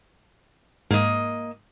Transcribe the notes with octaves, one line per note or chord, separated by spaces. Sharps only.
G#2 A#3 D#5